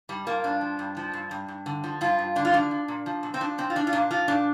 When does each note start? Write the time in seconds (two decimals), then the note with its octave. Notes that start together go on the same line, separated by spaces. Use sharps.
0.09 G2 G3
0.26 F3 A#3
0.44 G2 D4
0.61 F3
0.79 G2
0.97 F3
1.14 G2
1.31 G2
1.48 G2
1.66 D3
1.84 F3
2.01 G2 F4
2.19 G2
2.35 D3 D4
2.45 F4
2.53 F3 D4
2.71 F3
2.88 A#2
3.06 F3
3.23 A#2
3.34 C4
3.41 F3 D4
3.58 A#2 C4
3.70 F4
3.76 F3 D4
3.87 F4
3.93 A#2 D4
4.11 F3 F4
4.28 A#2 D4